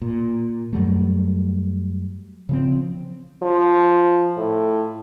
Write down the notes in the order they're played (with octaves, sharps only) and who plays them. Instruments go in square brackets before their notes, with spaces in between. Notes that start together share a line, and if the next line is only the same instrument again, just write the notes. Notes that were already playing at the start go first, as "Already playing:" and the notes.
[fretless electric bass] A#2
F#2 F#3 G3 A3
C#3 F3 C4
[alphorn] F3
A2